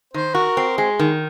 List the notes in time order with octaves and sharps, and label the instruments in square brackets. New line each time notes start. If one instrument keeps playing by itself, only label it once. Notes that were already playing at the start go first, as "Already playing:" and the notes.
[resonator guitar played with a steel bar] D#3 [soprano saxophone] C5
[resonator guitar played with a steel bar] F#4 [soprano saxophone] A#4
[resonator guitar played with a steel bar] C4
[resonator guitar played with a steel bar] G#3 [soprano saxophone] G#4
[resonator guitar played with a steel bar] D#3